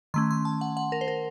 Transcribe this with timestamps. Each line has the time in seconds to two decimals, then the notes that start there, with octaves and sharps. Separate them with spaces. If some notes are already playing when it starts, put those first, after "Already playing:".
0.14 D#3 A3 C#4 C6
0.31 C6
0.45 A5
0.61 F#5
0.77 F#5
0.92 A#4
1.01 C5
1.08 A#4